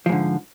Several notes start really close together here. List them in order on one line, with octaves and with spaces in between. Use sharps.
F3 G#2 D3